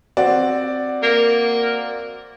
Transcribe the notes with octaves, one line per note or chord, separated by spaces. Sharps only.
C4 F#4 D5
A#3